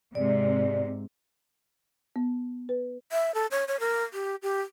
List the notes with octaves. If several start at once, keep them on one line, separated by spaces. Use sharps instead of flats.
G#2 C3 D5
B3
B4
E5
A4
C#5
C#5
A#4
G4
G4